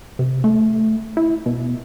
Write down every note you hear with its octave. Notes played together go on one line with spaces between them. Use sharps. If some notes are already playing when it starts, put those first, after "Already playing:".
C3
A3
E4
B2